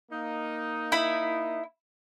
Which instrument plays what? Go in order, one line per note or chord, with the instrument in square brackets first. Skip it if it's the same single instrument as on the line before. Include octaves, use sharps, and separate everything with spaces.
[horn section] A#3 D#4
[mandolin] E4 B5